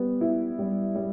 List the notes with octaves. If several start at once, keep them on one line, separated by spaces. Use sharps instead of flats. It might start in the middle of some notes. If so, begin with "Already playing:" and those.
Already playing: G3 B3
E4
G3
G3